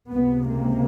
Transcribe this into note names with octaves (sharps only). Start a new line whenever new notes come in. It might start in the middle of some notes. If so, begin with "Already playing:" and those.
C#2 C3 B3
A#3